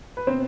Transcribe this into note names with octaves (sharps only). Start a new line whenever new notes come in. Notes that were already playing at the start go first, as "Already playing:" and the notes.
B4
B2 C4 C5